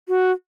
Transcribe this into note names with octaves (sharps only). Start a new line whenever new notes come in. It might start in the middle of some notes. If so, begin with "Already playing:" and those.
F#4